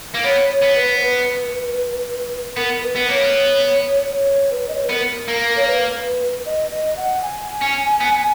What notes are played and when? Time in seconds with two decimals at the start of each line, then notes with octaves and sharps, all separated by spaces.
0.14 A#3
0.23 B3 C#5
0.49 C#5
0.62 B3
0.76 B4
0.97 C#5
1.02 B4
2.57 B3 A#4
2.83 B4
2.96 B3
3.09 A#3 C#5
3.21 B3
4.12 C#5
4.51 B4
4.68 D#5
4.75 C#5
4.83 B4
4.89 B3 A#4
5.28 A#3
5.56 C#5
5.67 B4
6.45 D#5
6.71 D#5
6.97 F#5
7.22 G#5
7.61 C#4
8.00 B3